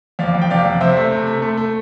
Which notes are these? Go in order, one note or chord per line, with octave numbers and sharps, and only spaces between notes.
F2 D5 F5
F2
G5
C3 D5 F5
F2
C3 C5 E5
A3
C3
A3
A3
A3